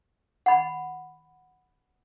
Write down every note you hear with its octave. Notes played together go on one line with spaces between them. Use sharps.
F#5 B5